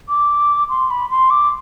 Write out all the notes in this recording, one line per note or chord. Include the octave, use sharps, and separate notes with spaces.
D6
C6
B5
C6
D6